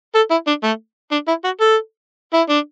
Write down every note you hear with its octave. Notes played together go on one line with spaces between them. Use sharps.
A4
E4
D4
A3
D4
E4
F#4
A4
E4
D4